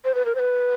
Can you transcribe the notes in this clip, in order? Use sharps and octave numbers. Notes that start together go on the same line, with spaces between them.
C5
B4
A#4
C5
B4